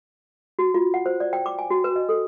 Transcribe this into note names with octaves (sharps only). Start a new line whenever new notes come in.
F#4
F4
F#5
C5
D5
G5
D6
G#5
F#4
B4
D#5
A4